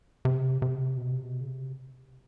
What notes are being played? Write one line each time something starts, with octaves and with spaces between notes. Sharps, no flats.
C3
C3
B2
C3
B2
C#3
C3